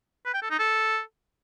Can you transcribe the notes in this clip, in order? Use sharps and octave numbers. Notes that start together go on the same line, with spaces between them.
B4
G5
A4
D#4
A4